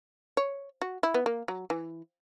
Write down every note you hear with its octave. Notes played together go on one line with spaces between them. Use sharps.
C#5
F#4
E4
B3
A#3
F#3
E3